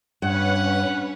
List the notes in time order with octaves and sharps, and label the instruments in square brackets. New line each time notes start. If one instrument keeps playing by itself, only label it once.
[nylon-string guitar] G2 [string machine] C#4 B4 C#5 [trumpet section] F#5